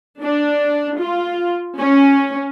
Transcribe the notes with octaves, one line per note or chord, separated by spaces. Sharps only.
D4
F4
C#4